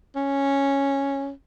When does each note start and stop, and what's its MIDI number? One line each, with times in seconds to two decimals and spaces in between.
0.16 1.30 61